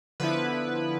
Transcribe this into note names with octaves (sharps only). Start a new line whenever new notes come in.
D3 F3 B3 E4 B4